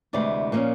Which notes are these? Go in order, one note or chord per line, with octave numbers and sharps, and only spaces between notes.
D2 C3 E3 G#3 D5
A#2 F3 A#3 C#4